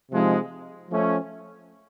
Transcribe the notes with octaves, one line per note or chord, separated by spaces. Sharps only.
C3 F3 G#3 C4 D#4
F3 A3 C#4